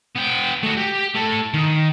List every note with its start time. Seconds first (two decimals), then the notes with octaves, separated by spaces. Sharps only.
0.16 B3 G5
0.63 A3 F#4
0.77 G4
1.14 A2 A4
1.54 D#3